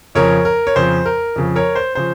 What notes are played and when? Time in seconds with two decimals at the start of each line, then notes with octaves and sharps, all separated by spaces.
0.15 F2 C#3 F3 A#4 C#5
0.45 A#4
0.67 C#5
0.76 F2 C#3 F3 C5
1.06 A#4
1.36 F2 C#3 F3
1.56 A#4 C#5
1.75 C5
1.95 C#3 F3 C5